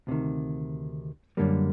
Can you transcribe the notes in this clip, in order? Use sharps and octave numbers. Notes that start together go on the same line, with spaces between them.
D2 C3 D#3
F#2 D3 G3 A#3